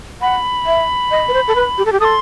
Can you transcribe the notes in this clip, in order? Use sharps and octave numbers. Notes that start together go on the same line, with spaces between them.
F#5 B5
E5
D#5
B4
C5
A4
B4
G4
A4
G4
A4 C6 D#6